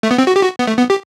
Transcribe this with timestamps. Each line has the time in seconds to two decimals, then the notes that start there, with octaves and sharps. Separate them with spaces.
0.03 A3
0.11 B3
0.18 C4
0.27 F#4
0.36 G4
0.43 F#4
0.59 B3
0.67 A3
0.78 B3
0.90 G4